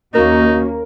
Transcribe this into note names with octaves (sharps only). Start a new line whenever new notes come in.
D#2 A#3 C#4 D#4 F#4 A#4